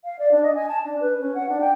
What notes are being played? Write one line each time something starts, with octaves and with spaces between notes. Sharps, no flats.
F5
D5
D4
D#5
G#5
A5
D4
B4
C#4
F#5
D4
G5